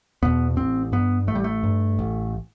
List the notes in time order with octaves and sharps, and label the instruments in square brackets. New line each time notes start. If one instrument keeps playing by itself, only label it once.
[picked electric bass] E2 B2 B3
A1 C4
G2 B3
A1 A3
G3
A3
G2
A1